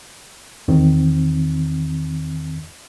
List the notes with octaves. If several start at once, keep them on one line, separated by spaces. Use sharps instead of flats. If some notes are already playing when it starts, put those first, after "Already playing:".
E2 D#3 C4